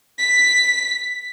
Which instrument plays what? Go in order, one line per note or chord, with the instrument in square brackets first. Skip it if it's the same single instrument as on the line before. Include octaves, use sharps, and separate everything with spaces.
[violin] B6